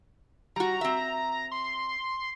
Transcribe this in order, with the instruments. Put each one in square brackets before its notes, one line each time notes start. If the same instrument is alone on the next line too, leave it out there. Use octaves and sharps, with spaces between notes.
[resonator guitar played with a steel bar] G3 F#4 [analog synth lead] A#5
[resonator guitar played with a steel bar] C4 E5
[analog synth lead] C6